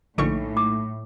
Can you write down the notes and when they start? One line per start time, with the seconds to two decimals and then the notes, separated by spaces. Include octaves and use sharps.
0.18 A#1 A2 D3 A#3 D#4 A4 C#6
0.57 D6